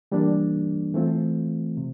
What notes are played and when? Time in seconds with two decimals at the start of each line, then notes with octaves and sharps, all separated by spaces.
0.12 E3 G3 A#3 D4
0.94 E3 A3 C4 F4
1.77 C3